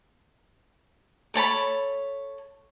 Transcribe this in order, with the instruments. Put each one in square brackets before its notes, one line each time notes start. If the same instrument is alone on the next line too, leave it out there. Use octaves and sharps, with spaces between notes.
[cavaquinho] A4 C#5 A5 B5